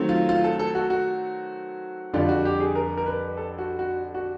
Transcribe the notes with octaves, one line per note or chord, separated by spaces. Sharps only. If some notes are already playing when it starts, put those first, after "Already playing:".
Already playing: D#3 F#3 A3 C4
F4
F4
A4
A4
F#4
F#4
F2 D3 G3 F4
F#4
G4
G#4
A#4
A#4
B4
A4
F#4
F#4
F#4